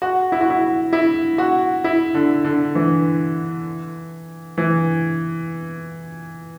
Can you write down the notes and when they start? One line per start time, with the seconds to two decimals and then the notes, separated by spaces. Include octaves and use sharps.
0.02 F#4
0.32 E4
0.41 F#4
0.50 E4
0.93 E4
1.38 F#4
1.84 E4
2.14 D3
2.44 D3
2.75 E3
4.58 E3